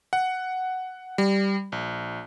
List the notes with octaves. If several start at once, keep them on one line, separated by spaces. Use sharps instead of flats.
F#5
G3
A#1